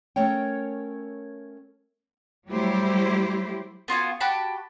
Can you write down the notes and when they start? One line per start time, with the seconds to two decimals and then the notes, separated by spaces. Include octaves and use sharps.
0.16 A3 C#4 A#4 C#5 G5
2.48 F#3 G3 A3 E4 G4 C5
3.88 B3 F4 F#4 G#5
4.20 F#4 G4 A5 B5